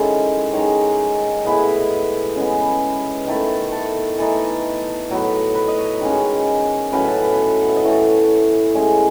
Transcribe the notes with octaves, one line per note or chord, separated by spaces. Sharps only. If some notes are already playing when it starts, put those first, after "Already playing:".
Already playing: D#3 G#3 C#4 E4 A4
D#3 G#3 D#4 C#5
A2 G#3 B3 E4
B4
C#3 G#3 B3
D#3 A3 E4
A4
E3 A3 D#4
A2 F#3 B3
B4
D#5
C#5
D#3 G#3 C#4
A2 F#3 C#4 B4
A4
B4
F#5
E5
D#5
A2 E3 A3 C#5
A2 G#3 C#4